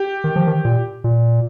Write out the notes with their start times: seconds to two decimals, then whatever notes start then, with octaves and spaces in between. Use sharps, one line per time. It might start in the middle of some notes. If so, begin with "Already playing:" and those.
Already playing: G4
0.24 D#3
0.36 F3
0.47 D#3
0.65 A#2
1.04 A#2